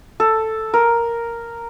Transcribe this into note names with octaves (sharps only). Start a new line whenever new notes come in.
A4
A#4